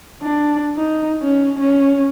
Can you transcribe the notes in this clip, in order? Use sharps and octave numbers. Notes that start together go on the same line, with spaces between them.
D4
D#4
C#4
C#4